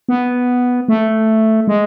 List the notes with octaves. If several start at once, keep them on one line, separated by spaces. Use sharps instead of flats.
B3
A3
G#3